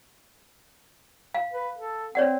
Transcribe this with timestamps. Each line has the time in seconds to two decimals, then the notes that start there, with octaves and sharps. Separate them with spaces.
1.35 F5
1.53 B4
1.78 A4
2.15 C4 C#5 D5 F#5